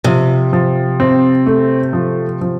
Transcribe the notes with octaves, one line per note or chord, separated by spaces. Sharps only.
C3 F3
F3
C4
A3
F3
F3